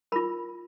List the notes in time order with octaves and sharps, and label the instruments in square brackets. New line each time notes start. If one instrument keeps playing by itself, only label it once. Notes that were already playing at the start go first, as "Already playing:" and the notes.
[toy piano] F4 A#4 B5